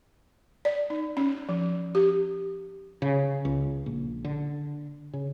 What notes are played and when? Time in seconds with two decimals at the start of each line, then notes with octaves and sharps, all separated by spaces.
0.65 D5
0.90 D#4
1.17 C#4
1.49 F3
1.95 G4
3.02 C#3
3.45 C#2
3.86 A#1
4.25 D3
5.13 C#3